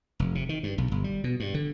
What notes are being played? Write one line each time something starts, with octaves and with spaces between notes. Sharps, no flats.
F1
C3
D#3
G2
B1
G1
G3
B2
G2
D3